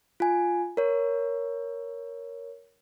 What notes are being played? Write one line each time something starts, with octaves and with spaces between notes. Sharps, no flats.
F4 G#5
A#4 C#5